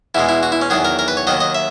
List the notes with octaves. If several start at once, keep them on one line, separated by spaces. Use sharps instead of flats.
E2 B2 G#3 E4
E4
F#4
E4
C#4
E2 D#3 F#3 G#4
A#4
A#4
B4
C#5
D#2 D#3 F#3 D#5
D#5
E5